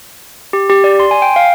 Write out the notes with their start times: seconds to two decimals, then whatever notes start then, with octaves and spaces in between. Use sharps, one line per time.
0.53 G4
0.70 G4
0.84 D5
1.00 C6
1.11 G#5
1.22 G5
1.36 F5